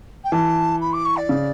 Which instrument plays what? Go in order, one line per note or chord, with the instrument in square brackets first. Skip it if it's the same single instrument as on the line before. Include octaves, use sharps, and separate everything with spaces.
[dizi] G5
[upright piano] E3 [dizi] A5
[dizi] B5
D6
C#6
D5
[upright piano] C#3